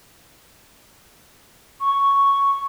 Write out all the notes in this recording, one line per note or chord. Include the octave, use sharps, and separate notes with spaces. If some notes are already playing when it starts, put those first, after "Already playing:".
C#6